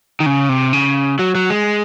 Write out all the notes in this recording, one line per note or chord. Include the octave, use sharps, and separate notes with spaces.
D#3
C#3
C3
C#3
F#3
F#3
G#3